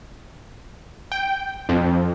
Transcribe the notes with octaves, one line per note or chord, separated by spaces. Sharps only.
G5
F2